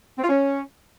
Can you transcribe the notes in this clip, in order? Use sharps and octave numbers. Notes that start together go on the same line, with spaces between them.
C4
F4
C#4